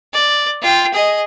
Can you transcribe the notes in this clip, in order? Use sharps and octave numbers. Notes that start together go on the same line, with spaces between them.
D5
F4 G5
G#4 D#5